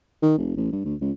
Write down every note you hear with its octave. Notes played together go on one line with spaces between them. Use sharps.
D#3
F1
A1
G2
D2
C#2